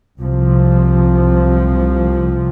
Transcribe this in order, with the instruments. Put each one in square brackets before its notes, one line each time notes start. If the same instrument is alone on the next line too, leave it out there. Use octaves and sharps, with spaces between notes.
[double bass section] C2 C3 F3